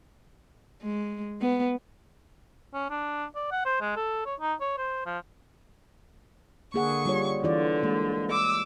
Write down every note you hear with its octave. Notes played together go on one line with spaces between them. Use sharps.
G#3
B3
C#4
D4
D5
F#5
C5
G#3
A4
C#5
D#4
C#5
C5
F3
D3 A#3 G#4 F#5 C#6
G3 F4 C#5
D3 E3 F4 D5
E3 G#3 A#3
D6 E6